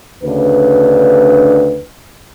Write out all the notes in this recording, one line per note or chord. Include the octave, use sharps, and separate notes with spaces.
D2 C#3 D4 B4